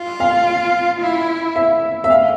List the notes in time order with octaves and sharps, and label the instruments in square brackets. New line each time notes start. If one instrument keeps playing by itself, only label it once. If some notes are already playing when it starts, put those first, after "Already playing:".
Already playing: [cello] F4
[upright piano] F5
[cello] E4
[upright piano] E5
E5
F5